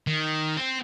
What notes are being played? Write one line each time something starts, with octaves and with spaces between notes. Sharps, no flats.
D#3
C4